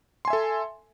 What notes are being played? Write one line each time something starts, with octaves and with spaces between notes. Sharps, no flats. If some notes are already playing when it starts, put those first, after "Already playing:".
A4 E5 G#5 C6